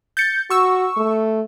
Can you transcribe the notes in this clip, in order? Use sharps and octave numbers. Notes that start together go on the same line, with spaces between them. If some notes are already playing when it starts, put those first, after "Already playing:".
G6 A6 C#7
F#4 C#6 E6
A3